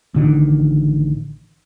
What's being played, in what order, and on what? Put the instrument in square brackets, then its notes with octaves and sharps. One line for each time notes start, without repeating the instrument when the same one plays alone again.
[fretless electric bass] A1 D3 D#3